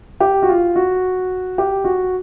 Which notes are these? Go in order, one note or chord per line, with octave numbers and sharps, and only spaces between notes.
G4
F#4
F4
F#4
G4
F#4